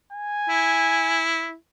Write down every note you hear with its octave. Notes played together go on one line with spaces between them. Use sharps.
G#5
E4